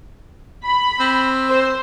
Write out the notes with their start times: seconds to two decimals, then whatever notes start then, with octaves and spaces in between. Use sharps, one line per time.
0.63 B5
1.00 C4
1.51 C5